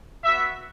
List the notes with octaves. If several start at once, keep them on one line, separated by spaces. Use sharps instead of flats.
B3 F#4 E5